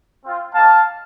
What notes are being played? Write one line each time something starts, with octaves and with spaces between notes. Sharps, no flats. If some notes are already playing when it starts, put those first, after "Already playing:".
C4 F4
A#3 D#4 G4 F5 A5